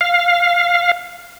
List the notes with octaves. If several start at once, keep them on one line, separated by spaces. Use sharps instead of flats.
F5